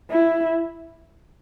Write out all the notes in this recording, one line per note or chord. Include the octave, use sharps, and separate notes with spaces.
E4